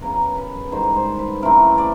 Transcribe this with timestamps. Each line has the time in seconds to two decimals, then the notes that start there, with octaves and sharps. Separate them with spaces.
0.01 C#3 F#3 B3 A#4
0.37 B4
0.72 G#2 D#3 G3 C5
0.96 C5
1.19 B4
1.42 C#3 E3 A3 C4 A#4
1.78 D5